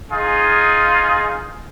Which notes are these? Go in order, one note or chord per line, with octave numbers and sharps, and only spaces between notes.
D#4 F4 G#4